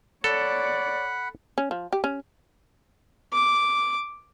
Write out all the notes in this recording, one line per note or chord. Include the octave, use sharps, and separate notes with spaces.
A4 C#5 D5 F#5 B5
C#4
F3
G4
C#4
D6